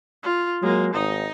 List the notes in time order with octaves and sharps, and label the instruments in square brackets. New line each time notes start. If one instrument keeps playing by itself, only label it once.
[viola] F4
[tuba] F#3 [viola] G#3 A#3
[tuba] G#1 [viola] D#4 D#5